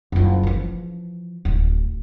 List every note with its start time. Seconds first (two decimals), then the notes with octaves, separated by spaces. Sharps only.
0.12 F#1 F4
0.43 E3 F3
1.45 D1